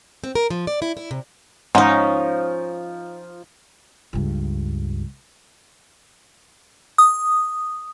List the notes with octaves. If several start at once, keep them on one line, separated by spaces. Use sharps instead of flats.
C4
A#4
F3
D5
E4
E4
C3
G#2 F3 C#4 D#4
C#2 G2
D#6